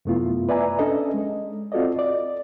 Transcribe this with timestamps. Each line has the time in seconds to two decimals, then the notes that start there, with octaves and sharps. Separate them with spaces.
0.05 F#2 C3 A3 B3 E4 F4
0.49 B4 D5 E5 G#5 A#5
0.79 C#4 D4 A4 D#5
1.14 G#3
1.72 C4 F4 F#4 A4 D5 D#5
1.99 D5